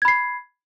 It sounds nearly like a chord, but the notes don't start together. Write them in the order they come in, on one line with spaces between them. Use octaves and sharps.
G#6 B5 C7